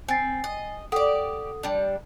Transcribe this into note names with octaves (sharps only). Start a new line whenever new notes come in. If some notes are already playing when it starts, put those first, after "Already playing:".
C4 G#5 A6 C7
D#5
G4 A4 D5 F#5 D#6
G3 D4